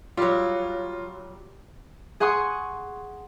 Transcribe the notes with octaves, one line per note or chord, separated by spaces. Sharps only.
F#3 G3 F4
G#4 F#5 C6 C#6 D#6